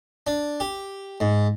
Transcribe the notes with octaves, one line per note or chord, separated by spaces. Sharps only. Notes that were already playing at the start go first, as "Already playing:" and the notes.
D4
G4
G#2